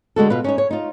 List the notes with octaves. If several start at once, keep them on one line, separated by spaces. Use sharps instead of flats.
D3 G#3 F#4 A4
B2 F4 B4
C#4 D#4 C#5
C#5
D#4 F4